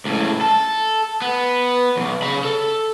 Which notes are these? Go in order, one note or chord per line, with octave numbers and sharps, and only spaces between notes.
C#2 A2
A4
B3
B1 E2
C#3 B5
A4